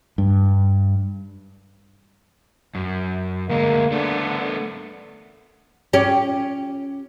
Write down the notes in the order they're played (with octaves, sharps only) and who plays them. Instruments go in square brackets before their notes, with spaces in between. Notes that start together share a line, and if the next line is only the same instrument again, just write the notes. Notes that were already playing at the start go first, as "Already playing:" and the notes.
[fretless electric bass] G2
[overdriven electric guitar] F#2
[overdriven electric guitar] D2 G#3 [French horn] A#3
[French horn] D3 [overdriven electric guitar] A3 B3
[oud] C#4 G4